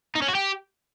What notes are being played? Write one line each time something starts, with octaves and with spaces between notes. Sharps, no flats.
D#4
C#4
F#4
G4